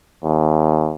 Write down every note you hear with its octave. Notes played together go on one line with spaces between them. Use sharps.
D#2